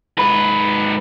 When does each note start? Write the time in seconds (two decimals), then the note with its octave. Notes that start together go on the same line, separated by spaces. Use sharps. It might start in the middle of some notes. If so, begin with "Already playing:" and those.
0.17 G#2 B4